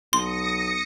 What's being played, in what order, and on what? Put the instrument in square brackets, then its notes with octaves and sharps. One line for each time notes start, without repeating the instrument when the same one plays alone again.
[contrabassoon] B1 [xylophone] C6 [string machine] D#6 A#6 C#7